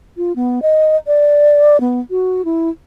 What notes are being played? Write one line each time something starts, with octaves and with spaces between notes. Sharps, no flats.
F4
B3
D#5
D5
B3
F#4
E4